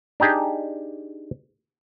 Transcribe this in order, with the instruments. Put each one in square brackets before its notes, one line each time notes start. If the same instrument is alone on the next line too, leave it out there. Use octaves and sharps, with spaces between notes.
[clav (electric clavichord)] D4 D#4 G4 G#4